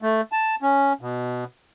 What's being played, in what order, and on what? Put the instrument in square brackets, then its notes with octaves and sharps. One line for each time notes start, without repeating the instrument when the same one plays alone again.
[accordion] A3
A5
C#4
B2